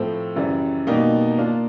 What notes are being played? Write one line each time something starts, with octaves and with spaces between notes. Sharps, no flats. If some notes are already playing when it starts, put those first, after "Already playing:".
Already playing: A2 F3 A3 C4
F#2 C#3 E3 G3
B2 G3 A#3 D#4
A#3 D4 F4